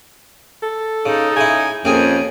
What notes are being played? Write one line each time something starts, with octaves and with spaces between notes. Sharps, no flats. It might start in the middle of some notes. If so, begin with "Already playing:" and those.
A4
C#3 D#4
C#3 E4 G#5
F2 A#3 C#4 G4 G#4 G#5